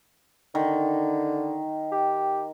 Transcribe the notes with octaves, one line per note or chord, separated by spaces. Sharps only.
D3 D#3
G4